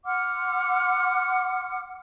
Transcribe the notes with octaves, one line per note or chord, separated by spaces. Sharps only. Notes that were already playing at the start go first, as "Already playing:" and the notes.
F#5 C6 D6 F6